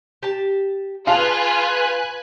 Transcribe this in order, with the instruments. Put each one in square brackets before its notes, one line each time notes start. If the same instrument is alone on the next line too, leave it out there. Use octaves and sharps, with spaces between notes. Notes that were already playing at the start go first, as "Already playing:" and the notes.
[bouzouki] G4 A5
[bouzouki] D4 G#4 [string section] F4 [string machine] B4 G#5 F#6 [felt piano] F5 A5